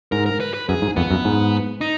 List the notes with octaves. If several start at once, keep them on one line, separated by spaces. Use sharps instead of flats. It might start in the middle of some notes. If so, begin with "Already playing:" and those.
G#2 A#4
A#4
B4
B4
F#2 G#4
G#2
F2 B3
F#2
G#2
D#4